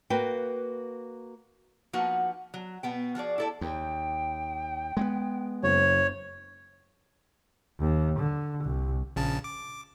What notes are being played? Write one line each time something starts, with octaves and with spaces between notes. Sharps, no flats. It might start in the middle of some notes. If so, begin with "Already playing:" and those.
A#3 F#4 B4 F5 G5
F3 A#3 D#4 F#4 B4 F#5
F#3
B2 B3 G5
F3 F#4 G#4 D5
E4 A4 D5
D#2 G5
G#3 A#3 B3
F#1 C5 C#5
D#2
D3
C2
A#1 C#3 A5
D6